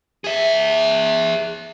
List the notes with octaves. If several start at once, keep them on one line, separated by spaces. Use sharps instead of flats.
G#4 E5